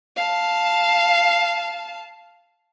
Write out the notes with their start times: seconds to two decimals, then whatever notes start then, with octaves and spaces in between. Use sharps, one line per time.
0.17 F5 A5